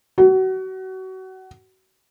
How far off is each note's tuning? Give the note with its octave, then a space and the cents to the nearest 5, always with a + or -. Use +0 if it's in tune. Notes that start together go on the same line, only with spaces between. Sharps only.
F#4 +30